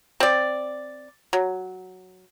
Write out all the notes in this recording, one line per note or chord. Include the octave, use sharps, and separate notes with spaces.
C4 D5
F#3